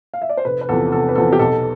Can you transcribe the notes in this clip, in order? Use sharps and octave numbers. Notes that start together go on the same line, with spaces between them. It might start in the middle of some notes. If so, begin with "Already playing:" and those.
F5
E5
D5
C5
F1 B4
B4
E2 C3 F3 B3 A4
F1 A4
B4
E2 C3 F3 B3 A4
G4
B1 A4